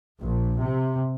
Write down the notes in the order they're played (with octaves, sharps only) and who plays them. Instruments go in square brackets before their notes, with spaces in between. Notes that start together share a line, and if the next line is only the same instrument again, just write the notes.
[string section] A#1
C3